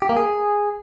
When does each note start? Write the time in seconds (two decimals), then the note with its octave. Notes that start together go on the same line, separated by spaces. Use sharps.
0.02 G4
0.09 A#3
0.17 G#4